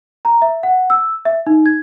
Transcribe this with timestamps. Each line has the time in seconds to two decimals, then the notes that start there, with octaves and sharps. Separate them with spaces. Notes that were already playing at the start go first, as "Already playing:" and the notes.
0.25 A#5
0.42 E5
0.63 F#5
0.90 E6
1.25 E5
1.47 D#4
1.66 G#6